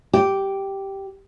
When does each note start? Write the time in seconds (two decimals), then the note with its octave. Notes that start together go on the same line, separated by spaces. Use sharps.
0.13 G4